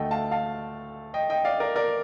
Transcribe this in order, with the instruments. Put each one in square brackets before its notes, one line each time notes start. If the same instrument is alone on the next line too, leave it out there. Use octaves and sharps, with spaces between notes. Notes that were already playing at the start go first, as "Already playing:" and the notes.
Already playing: [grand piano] D2 D3 A3 D#5 G5
F5 A5
F5 A5
D#5 G5
D#5 G5
D5 F5
A#4 D5
A#4 D5